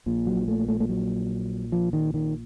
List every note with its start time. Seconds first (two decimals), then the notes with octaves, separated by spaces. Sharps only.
0.06 A#1 A#2
0.27 F#3
0.48 A3
0.68 A3
0.80 A3
0.89 F#3
1.72 F3
1.93 D#3
2.14 D#3